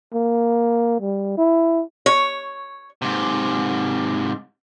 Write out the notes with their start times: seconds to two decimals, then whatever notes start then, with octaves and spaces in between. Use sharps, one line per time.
0.14 A#3
1.01 G3
1.38 E4
2.06 C#5
3.02 G#2 C3